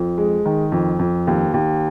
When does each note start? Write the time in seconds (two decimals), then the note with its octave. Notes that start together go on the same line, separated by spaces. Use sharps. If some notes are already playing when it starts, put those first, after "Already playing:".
Already playing: F2
0.18 G#3
0.45 D#3
0.72 F2
0.99 F2
1.27 D#2
1.54 D#2